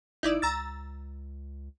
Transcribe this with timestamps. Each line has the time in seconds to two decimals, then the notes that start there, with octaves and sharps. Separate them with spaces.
0.23 G1 D#4 E4 D5
0.42 C#2 A#5 E6 A6